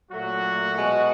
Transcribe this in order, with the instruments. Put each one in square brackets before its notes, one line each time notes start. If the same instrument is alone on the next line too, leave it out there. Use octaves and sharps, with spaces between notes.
[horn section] A#2 F#3 A3 F#4
B2 G#3